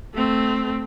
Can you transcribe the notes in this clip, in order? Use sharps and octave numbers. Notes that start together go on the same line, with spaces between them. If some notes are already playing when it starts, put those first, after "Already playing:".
A3 C4